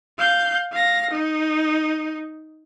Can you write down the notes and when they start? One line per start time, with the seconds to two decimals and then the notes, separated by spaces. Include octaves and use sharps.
0.18 F5 G6
0.72 F5 A#6
1.10 D#4